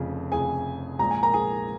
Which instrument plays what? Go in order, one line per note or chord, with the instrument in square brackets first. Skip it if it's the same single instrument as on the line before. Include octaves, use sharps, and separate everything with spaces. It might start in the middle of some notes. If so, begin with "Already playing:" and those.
Already playing: [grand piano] F1 F2 C#3
F1 F2 C#3 G#4 G#5
A#1 A#2 G#3 A#5
G#5
A#4 A#5
G#4 G#5